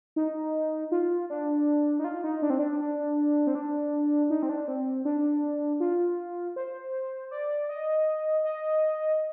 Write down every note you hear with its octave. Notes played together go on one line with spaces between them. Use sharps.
D#4
F4
D4
D#4
F4
D#4
D4
C4
D4
D4
C4
D4
D#4
C4
D4
C4
D4
F4
C5
D5
D#5
D#5